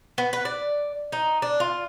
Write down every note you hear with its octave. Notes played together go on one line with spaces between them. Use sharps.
B3
B4
D5
D#4
D4
F4